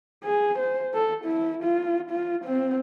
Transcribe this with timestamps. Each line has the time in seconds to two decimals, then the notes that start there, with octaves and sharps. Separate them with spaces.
0.24 G#4
0.58 C5
0.94 A4
1.24 E4
1.63 F4
2.10 F4
2.45 C4